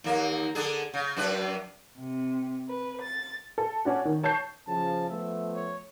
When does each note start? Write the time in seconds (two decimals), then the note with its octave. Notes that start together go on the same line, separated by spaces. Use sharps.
0.04 D#2 A#3
0.55 D3 D4 G#4
0.94 C#3
1.17 F#2 D4 B4
2.00 C3
2.69 B4
3.01 A6
3.58 A4
3.85 C#4 D4 F#4
4.05 D#3
4.23 C#5 A5 C#6 G6 C7
4.68 C#3 F3 A5
5.10 F3 A3 B3 E5
5.55 C#5